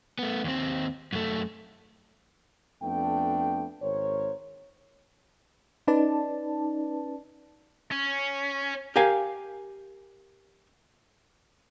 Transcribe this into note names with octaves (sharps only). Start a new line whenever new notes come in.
A3 B3
D#2 C4
F#2 A3
F2 A3 B3 D4 G5
G#1 A#4 C5 C#5
C#4 D#4 B4 D5 A5
C#4
G4 A#4 F5 G#5